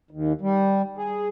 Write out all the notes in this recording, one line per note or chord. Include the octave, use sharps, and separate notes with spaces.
D#2
G3
G#4